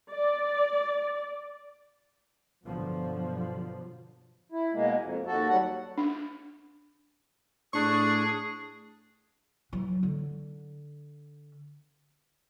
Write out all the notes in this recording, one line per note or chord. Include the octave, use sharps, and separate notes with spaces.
D5
G1 B2 D3 F3 F#3
E4
B2 G#3 A#3
F2
D#2 F#4 A4
F#3 G3 F#5
D4
A2 D4 G#4 C#6
E3 F#3
D3